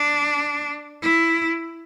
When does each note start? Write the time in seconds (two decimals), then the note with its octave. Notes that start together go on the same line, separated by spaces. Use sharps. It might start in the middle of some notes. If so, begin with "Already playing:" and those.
Already playing: D4
1.02 E4